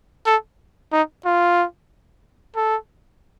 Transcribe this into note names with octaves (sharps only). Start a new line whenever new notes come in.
A4
D#4
F4
A4